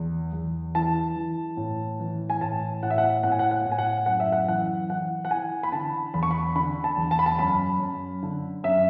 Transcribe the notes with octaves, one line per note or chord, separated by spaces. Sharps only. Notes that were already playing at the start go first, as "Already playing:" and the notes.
Already playing: E2
E2
E3 A5
E3
A2
E3
G#5
A2 A5
A2 F#5
E5
F#5
A2 F#5
G#5
F#5
F#5
A2
G#5
F#5
F#2 F#5
E5
F#5
E3 F#5
E3 F#5
F#5
E3 G#5
B5
D3 A5
E2 B5
C#6
B5
D3 B5
A5
E2
A5
B5
A5
F#2 B5
F#2
D3
F#2 E5